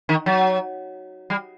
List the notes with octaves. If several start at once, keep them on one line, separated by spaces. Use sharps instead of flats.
D#3
F#3
G3